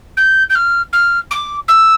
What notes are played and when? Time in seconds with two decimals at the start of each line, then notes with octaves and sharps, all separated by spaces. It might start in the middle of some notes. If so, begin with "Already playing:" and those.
0.17 G6
0.49 G6
0.55 F6
0.92 F6
1.30 D6
1.68 E6